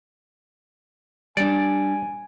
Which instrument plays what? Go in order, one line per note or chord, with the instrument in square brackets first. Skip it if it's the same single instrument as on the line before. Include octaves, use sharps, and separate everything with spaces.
[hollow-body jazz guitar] G3 D4 [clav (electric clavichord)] D5 [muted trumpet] G#5